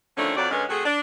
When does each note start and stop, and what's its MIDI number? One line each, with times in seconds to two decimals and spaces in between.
0.17 0.33 50
0.17 0.33 51
0.17 0.33 53
0.17 0.33 57
0.17 0.33 61
0.17 0.33 62
0.36 0.50 41
0.36 0.50 54
0.36 0.50 74
0.50 0.64 42
0.50 0.64 50
0.50 0.64 56
0.50 0.64 59
0.50 0.64 61
0.69 0.82 48
0.69 0.82 57
0.69 0.82 66
0.69 0.82 68
0.84 0.99 62